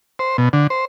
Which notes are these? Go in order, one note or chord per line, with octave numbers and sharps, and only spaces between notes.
C5
B2
D3
C5